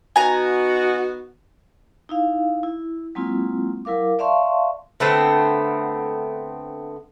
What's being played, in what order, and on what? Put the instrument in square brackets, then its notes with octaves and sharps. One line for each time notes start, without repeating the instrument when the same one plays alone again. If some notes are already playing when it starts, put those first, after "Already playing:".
[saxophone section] B3 D#4 F#4 [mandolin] G#5 A#5
[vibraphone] D#4 E4 F5
E4
F#3 G#3 A#3 C4 E4 F4
F#3 E4 A#4 F5 D6
D5 E5 F5 A5 C6 C#6
[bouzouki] D3 A3 B3 C4